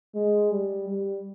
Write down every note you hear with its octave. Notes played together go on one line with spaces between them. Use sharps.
G#3
G3
G3